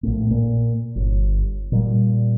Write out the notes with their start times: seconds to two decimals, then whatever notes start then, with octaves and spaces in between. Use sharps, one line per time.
0.03 A#1 A2
0.31 A#2
0.96 G1
1.72 A#2 G3